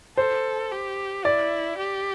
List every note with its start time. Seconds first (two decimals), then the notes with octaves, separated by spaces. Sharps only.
0.17 A4 C5
0.72 G4
1.25 E4 D5
1.78 G4